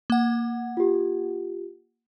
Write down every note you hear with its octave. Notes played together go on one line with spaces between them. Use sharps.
A#3 F#5
F4 G4